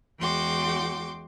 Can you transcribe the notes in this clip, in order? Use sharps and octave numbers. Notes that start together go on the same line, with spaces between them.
E2 G#3 F#4 G5 C6 D6